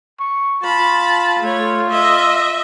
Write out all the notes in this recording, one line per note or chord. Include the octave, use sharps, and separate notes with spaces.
C#6
F4 A5 B5
A3 C#5
D#5 E5